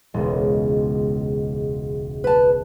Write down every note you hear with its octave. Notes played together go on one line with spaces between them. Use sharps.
E1 C#2
B4 A5